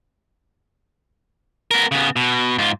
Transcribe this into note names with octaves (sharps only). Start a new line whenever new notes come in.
B3 A#4
C#3 B3
B2
G#2 F4